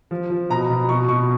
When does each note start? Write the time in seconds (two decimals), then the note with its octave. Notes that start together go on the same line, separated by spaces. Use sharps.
0.11 F3
0.30 F3
0.50 B2 A#5
0.70 B2
0.89 B2 C#6
1.08 B2 C#6